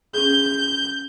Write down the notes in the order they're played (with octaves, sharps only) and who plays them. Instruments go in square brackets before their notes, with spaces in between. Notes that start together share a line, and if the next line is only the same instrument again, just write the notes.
[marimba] C#4 G#4 [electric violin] G6